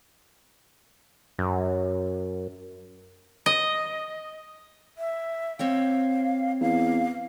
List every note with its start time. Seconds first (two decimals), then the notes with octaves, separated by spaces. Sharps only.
1.38 F#2
3.46 D#5
4.98 E5
5.59 C4 C#5 F5 G5
6.61 E2 F5